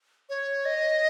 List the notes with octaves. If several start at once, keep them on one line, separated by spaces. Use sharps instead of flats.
C#5
D#5